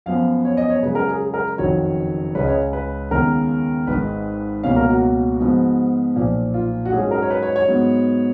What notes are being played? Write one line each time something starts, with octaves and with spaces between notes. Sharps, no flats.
F#2 F3 B3 F5
C#5
D#5
C#5
F#2 C#3 G#3 B4
A#4
G#4
G#4
A#4
F#1 F2 D#3 F#3 C#5
C#2 C#3 G#3 C#4 B4
D#5
C#5
B4
D#2 C#3 G#3 B3 A#4
G#1 G#2 D#3 B4
C#2 B2 A#3 C#4 F5
A#4
F#4
G#2 F3 B3
B1 A#2 F3
F4
F#4
G#2 F#3 C#4 G#4
A#4
C#5
B4
C#5
C#5
G#2 F#3 B3